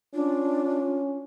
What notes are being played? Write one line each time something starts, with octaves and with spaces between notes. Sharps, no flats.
C#4 D4 F4